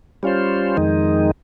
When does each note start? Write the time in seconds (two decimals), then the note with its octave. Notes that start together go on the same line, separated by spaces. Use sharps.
0.23 G3 C#4 F4 C5
0.77 F2 D#3 G#3 D#4